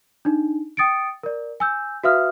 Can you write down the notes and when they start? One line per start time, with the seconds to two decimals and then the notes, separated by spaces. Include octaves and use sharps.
0.25 D4 D#4
0.77 G5 D#6 A6 C#7 D7
1.23 A#4 D5
1.60 G#5 E6 G6
2.03 F#4 B4 E5 F5 D#6 F6